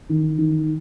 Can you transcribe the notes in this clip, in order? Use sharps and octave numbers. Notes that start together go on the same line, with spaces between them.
D#3
D#3